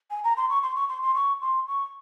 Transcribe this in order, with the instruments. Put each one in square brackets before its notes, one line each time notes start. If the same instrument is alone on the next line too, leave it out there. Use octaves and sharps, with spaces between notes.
[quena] G#5
A#5
C6
C#6
C6
C#6
C6
C6
C#6
C6
C#6